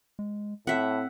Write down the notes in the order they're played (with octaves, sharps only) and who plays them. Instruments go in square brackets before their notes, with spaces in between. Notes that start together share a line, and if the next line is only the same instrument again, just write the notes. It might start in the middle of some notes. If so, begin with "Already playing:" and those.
[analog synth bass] G#3
[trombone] A2 [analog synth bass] C4 [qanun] E5 F#5